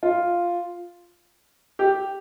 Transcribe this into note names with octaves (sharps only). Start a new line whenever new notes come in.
F4
G4